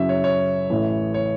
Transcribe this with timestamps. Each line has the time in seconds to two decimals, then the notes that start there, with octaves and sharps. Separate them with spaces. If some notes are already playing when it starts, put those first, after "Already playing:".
Already playing: F#2 C#3 F#3 C#4 E4 E5
0.09 C#5
0.24 C#5
0.70 A1 A2 E3
1.14 C#5